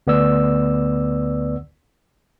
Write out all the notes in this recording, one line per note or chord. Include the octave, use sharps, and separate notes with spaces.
D2 B3 D5 E6